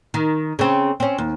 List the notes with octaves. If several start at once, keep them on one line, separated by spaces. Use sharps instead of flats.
D#3
C#3 C4
C4 C#4
D#2